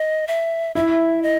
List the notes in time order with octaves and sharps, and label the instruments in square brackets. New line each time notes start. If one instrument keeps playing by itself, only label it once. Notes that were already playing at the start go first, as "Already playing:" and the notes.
Already playing: [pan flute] D#5
E5
[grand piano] E4 [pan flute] E5
[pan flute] D#5